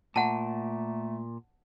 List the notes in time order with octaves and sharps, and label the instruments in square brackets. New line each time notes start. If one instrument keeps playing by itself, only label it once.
[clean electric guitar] A#2 [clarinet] A3 [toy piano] F#5 A5